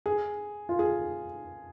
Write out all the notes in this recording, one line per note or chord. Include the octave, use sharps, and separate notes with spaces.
G#4
F4
G#4